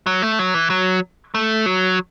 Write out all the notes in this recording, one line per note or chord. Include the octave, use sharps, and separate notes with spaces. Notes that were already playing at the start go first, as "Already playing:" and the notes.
F#3
A3
F#3
E3
F#3
A3
F#3